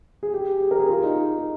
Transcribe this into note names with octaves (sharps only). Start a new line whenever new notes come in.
G#4
G4
G#4
A#4
G#4
F4
D#4